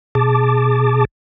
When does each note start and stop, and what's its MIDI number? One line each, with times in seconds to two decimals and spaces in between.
0.15 1.05 47
0.15 1.05 68
0.15 1.05 81
0.15 1.05 86